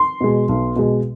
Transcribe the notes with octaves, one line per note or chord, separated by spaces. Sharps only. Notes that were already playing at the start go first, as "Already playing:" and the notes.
Already playing: C6
B2 G#3
B1
B2 G#3